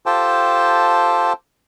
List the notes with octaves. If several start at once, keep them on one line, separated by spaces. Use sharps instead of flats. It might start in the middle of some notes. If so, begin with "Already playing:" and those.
F4 G4 A4 C5 G5 A5